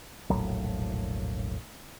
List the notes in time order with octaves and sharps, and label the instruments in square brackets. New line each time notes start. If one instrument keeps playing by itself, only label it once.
[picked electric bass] E1 A#1 A2 F#3